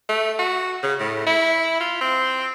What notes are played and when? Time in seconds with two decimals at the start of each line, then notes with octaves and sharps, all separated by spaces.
0.09 A3
0.39 F#4
0.83 C#3
1.00 A2
1.27 E4
1.80 F4
2.01 C4